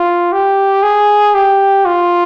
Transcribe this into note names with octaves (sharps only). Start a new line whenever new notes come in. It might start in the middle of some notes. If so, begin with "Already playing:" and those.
Already playing: F4
G4
G#4
G4
F4